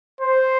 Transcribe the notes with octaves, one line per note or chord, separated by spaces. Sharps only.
C5